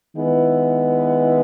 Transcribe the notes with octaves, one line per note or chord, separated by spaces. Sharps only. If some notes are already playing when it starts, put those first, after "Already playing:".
D#3 G#3 B3 E4 B4